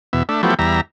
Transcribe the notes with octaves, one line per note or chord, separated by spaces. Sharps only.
E2 B2 E5
A3 D4 E5
F3 F#3 A3 B3 E4 G4
E2 G3 E5 A#5